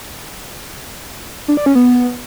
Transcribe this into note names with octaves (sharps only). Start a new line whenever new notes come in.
D4
D5
C#4
B3